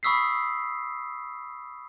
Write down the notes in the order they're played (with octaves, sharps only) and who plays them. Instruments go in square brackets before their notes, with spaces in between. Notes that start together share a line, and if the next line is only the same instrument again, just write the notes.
[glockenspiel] B5 C#6 D#6 E6 B6 C7